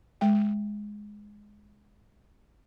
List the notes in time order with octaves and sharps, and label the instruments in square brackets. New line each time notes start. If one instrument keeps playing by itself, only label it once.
[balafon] G#3 G5